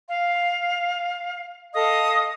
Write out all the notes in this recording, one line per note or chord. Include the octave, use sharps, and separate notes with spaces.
F5
A4 D#5 F5 D#6